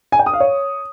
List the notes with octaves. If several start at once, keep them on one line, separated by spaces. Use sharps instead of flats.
G#5
G5
D#6
F5
C#5